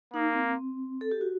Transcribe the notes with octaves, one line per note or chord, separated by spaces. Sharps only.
A#3 D#4
C4
A4
G4
F#4